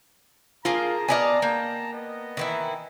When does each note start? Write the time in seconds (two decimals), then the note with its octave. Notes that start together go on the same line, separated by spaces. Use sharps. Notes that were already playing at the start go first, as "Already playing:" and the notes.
0.65 F3 A#3 F4 G#4 A#4 A5 A#5
1.08 B3 D5 D#5 F5 G#5
1.42 A#3 G5
1.93 B3 D#5
2.37 D#3 E3 E4